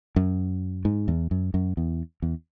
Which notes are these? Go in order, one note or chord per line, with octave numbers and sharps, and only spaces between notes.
F#2
G#2
E2
F#2
F#2
E2
E2